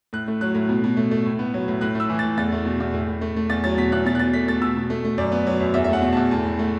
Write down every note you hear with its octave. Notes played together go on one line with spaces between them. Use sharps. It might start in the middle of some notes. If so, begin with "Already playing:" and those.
A2 F#6
A3
F#3 F#6
A2
B2
B2
A3
A3
A2
B3
F#3
A2
A2 F#6
A3 E6
E3
A6
A2
E2 A6
A3
B2
E2
A2
A2
A3
A3
E2 A6
F#3 A6
B2 B6
E2 F#6
B2 A6
F#6
B2 A6
A3 B6
A3 A6
B2 E6
B2
A3
A3
F#2 D5
B3
F#3
F#2
E2 E5
E5
A3 F#5
B2
A5
E2
A2 A5
A2
A3